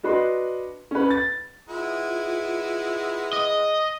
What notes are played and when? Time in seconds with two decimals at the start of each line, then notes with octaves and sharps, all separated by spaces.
0.03 D4 F#4 B4 D#5 C6
0.91 C#4 B4
1.10 A6
1.69 G#3 B3 E4 F4
3.33 D#5